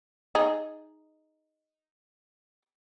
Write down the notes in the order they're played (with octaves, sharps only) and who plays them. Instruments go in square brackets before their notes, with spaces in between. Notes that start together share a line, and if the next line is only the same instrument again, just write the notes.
[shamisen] D#4 G#4